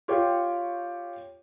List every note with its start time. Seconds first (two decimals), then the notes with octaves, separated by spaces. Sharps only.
0.08 F4 G4 C#5 G5